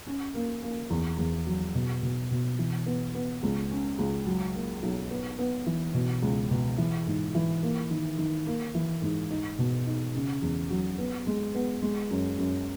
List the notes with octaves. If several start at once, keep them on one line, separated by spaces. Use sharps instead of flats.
C#4
A#3
A#3
E2
E2
F#3
B2
B2
B2
E3
B3
B3
C#2
C#4
C#2
F#3
A#3
B1
B3
B3
E3
B2
C#2
B2
E3
G#2
E3
A#3
D#3
D#3
A#3
E3
G#2
D#4
B2
D#4
C#3
E2
F#3
B3
G#3
B3
G#3
F#2
F#2